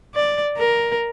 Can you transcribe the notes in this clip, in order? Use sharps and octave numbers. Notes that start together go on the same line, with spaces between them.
D5
A#4